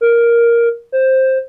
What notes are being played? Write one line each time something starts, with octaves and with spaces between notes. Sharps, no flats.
A#4
C5